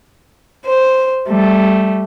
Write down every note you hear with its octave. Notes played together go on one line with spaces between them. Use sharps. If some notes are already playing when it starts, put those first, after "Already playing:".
C5
G3 A3